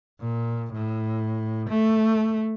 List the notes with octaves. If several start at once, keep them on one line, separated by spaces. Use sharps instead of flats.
A#2
A2
A3